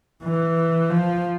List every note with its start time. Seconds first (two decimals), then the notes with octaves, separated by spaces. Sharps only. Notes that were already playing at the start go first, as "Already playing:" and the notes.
0.24 E3
0.90 F3